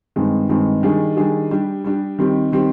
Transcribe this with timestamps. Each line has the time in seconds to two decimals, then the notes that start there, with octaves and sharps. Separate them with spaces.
0.16 G2 D#3 G#3 C4
0.49 G2 D#3 G#3 C4
0.83 D#3 G3 D4 G#4
1.17 D#3 G3 D4 G#4
1.51 G3 D4 G4
1.84 G3 D4 G4
2.19 D#3 G3 C4 G4
2.52 D#3 G3 C4 G4